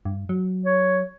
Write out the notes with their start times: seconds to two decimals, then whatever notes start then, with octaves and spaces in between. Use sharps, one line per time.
0.05 G2
0.29 F#3
0.65 C#5